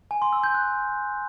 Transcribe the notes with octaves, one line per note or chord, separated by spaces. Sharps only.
G#5
C6
E6
G6
F#6